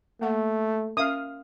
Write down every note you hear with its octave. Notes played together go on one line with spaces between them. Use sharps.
A3 A#3 F#5
C#4 A#4 E5 F5 D#6